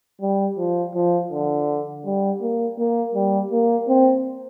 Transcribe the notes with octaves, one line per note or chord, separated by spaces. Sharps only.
G3
F3
F3
D3
G3
A#3
A#3
G3
A#3
C4